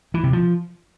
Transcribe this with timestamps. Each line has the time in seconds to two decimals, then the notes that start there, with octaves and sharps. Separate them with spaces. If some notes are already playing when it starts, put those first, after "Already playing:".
0.14 E3
0.24 C3
0.33 F3